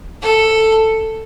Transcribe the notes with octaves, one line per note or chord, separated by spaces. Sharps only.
A4